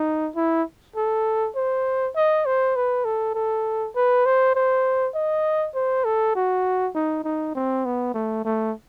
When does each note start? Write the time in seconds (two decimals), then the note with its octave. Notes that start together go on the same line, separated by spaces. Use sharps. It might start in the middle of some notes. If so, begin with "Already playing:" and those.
Already playing: D#4
0.36 E4
0.96 A4
1.56 C5
2.16 D#5
2.46 C5
2.76 B4
3.05 A4
3.35 A4
3.95 B4
4.26 C5
4.55 C5
5.14 D#5
5.75 C5
6.04 A4
6.35 F#4
6.95 D#4
7.24 D#4
7.55 C4
7.85 B3
8.14 A3
8.45 A3